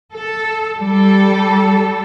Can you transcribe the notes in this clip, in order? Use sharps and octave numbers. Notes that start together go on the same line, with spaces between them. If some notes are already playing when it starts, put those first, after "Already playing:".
A4
G3 A4